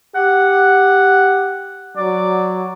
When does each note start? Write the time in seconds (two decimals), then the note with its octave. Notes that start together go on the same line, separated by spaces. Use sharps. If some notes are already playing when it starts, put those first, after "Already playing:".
0.15 G4 F#5
1.97 F#3 D5